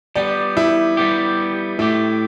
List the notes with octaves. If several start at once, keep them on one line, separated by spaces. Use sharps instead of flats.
G3 B3 G4 D5
E4
G3 B3 G4
A2 A3 E4 G4